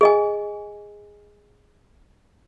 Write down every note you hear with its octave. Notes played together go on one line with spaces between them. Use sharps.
G#4 D#5 G#5